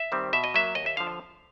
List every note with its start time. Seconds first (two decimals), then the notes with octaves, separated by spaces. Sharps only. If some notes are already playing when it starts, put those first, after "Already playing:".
Already playing: E5
0.12 D#3 G3 C4
0.33 B2 E5
0.44 D#5
0.54 F#3 A#3 E5
0.75 D#2 D#5
0.86 E5
0.97 D3 F3 F5